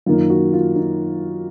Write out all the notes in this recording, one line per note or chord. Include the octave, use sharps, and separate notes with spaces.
F#2 D#3 A#3 D#4 F4
F#4
F4
D#4